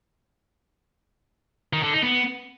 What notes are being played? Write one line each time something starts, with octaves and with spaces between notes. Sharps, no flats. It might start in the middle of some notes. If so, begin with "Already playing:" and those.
D#3
D3
D#4
B3